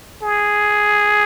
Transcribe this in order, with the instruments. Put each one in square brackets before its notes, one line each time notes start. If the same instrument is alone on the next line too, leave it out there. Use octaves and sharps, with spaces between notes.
[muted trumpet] G#4